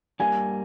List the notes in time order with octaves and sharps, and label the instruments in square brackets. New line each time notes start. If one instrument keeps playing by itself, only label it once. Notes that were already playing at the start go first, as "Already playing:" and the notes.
[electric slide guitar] G2 G3 A#3 [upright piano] G#5